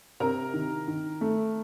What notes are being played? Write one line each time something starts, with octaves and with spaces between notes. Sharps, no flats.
C3 A#4 A#5
D#3
D#3
A3